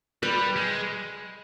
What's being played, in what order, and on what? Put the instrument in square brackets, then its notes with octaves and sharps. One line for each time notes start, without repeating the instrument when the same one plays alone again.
[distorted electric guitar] G3 [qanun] B4
[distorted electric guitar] G#3